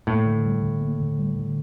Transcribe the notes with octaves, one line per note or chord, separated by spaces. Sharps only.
A2 A#3
D3
G3
D3
A#3
D3
G3
D3